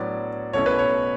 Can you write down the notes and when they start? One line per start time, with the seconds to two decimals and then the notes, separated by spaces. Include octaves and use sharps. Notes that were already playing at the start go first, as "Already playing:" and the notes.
Already playing: A2 F#3 B3 D4 D5
0.53 B1 B2 A3 C#4 E4 C#5
0.66 B4
0.79 C#5